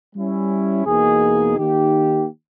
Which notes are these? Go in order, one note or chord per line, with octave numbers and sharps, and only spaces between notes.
G3 C#4 E4
E2 B2 A#3 D#4 G#4
D#3 A#3 D#4 G4